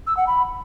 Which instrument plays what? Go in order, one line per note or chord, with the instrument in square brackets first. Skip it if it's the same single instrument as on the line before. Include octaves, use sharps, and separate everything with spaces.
[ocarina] E6
F#5
B5